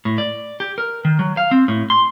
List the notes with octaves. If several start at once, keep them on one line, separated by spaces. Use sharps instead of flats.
A2
D5
G4
A#4
D#3
F#3
F5
C4
A2
C6